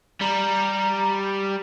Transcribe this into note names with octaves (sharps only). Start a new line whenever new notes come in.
G3 A#5